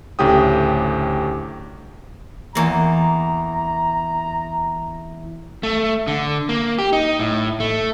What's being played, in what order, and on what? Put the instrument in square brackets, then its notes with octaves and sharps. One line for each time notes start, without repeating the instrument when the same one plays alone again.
[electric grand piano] D2 A2 C#3 G4 G5 D#6
[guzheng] E2 A#3 [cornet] A#5
[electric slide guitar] A3
D3
A#3
G4
D#4
A2
A3